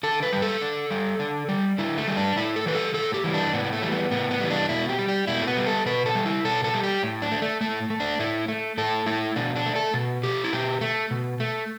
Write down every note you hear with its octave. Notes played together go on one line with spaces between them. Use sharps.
D3 A4
B4
G3
A4
D3
G3
D3
G3
D3 E4
A3
G3
D4
A2 E4
A4
E3 G3 B4
A4
A2 A4
G4
E3 G3
D4
A2 B3
B3
A3
E3 G3
B3
A2 B3
B3
E3 G3
D4
B2 E4
G4
G3
G4
B2 E4
A3
B3
G3
A4
B2 B4
A4
G3
E4
B2 A4
A4
G3
G4
A2
D4
A3
A3
A2 A3
A3
D4
A2 E4
A3
A2 A4
A3 E4
B2 D4
D4
A3
A4
B2
A3 G4
E4
B2 G4
A3
B2
A3